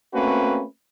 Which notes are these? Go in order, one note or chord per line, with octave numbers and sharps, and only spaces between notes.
A3 A#3 C4 C#4 F#4 B4